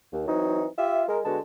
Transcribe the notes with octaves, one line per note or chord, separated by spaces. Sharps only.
D#2
E3 F#3 C4 D#4
F4 G4 E5
G#3 A#4
D3 G#3 B3 F#4 A5